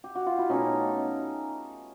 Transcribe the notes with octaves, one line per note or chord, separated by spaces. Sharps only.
G4
F#4
F4
E4
B2 F#3 A3 C#4 D#4